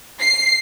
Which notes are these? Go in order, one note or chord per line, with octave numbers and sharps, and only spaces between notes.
C7